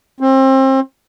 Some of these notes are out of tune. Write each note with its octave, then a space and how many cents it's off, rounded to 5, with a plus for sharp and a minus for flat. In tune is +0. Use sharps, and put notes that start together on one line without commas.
C4 +30